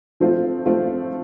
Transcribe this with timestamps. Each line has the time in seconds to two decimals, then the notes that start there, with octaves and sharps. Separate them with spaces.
0.20 F3 A3 C4 F4
0.66 F3 A3 C4 F4